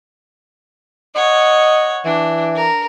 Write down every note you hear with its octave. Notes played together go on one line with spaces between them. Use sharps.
C#5 D#5 F#5
E3 D4
A#4